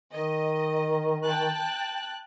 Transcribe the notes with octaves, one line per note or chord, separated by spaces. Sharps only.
D#3 D#5
G5 A5 F#6